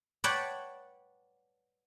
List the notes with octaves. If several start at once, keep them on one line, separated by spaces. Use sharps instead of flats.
B4 C#5 D5 F#5 G5 A5